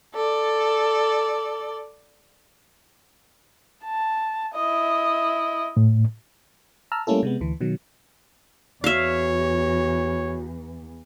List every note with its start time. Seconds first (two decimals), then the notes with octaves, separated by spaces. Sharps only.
0.15 A4 D5
3.85 A5
4.55 E4 D#5
5.77 A2
6.92 A5 A#5 E6 F6
7.07 G3 A3 A#3 C#4 E4 A4
7.23 C3 G#3 B3
7.41 D2 E3
7.61 B2 D#3 F#3
8.84 E2 F#4 C#5 E5 F5